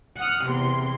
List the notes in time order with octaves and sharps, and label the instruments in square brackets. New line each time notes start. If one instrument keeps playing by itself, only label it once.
[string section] F#5 D#6 F6
E2 C3 C6